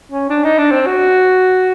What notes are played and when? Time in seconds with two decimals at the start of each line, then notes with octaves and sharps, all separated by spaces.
0.12 C#4
0.29 D4
0.44 D#4
0.58 D4
0.71 C4
0.86 F#4